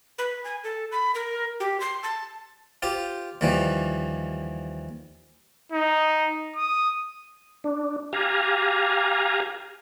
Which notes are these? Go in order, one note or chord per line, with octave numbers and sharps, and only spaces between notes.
B4
G#5
A4
B5
A#4
G4
C6
A5
F4 G4 C5
D#2 E3 F3 G3
D#4
D#6
D4
G4 F5 G#5 A#5